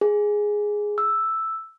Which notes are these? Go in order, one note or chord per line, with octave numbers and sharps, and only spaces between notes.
G#4
E6